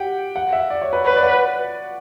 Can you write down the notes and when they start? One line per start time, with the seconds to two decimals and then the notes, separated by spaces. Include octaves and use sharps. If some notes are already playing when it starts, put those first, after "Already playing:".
Already playing: G4 F#5 G5
0.36 F#5
0.53 E5
0.70 D5
0.81 C#5
0.93 B4
1.04 B4 C#5
1.16 D5
1.23 F#5